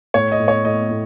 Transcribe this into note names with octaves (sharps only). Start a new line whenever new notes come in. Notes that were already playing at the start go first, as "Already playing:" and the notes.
A2 C#5
D#5
A2
C#5
A2 D#5
A2